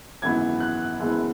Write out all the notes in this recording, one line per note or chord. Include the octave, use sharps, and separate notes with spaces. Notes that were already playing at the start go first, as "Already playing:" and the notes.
G#1 F#2 C#3 E3 B3 G#6
F#6
F#1 F#2 E3 G#3 B3